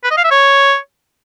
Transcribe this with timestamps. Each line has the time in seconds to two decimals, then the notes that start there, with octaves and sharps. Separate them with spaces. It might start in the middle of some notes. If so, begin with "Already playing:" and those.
0.04 B4
0.11 D#5
0.18 F5
0.24 E5
0.31 C#5